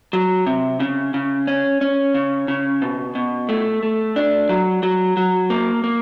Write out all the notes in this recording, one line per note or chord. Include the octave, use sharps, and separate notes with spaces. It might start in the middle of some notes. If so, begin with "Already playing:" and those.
F#3
C3
C#3
C#3
C#4
C#4
C#3
C#3
B2
B2
A3
A3
D4
F#3
F#3
F#3
A#3
A#3